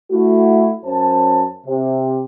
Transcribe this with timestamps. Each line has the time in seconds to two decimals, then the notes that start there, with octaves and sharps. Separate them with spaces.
0.12 A3 E4 F#4
0.85 F#2 C#4 C5 A5
1.67 C3